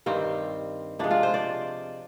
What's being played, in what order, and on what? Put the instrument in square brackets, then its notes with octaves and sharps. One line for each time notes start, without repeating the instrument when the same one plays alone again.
[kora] G2 D#3 G3 C4
C3 F3 G#3 D4
F4
C5
D5